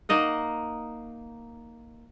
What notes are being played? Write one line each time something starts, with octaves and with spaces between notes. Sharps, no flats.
A#3 D#4 D#5 F#5